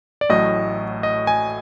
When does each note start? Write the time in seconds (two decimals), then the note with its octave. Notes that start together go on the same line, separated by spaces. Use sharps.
0.21 D5
0.29 A1 A2 F#3 A3 D#5
1.03 D#5
1.27 G#5